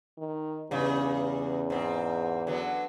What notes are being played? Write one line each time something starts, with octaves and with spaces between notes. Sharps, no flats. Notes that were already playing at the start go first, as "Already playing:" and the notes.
D#3
E2 G2 C#3
G#2 C4
D3 F#3 B3